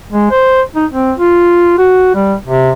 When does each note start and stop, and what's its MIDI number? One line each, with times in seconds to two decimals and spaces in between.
0.13 0.28 56
0.31 0.61 72
0.75 0.85 63
0.91 1.12 60
1.18 1.75 65
1.78 2.10 66
2.15 2.34 55
2.46 2.71 48